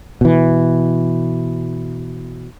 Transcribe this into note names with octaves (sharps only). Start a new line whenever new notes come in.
B2 E3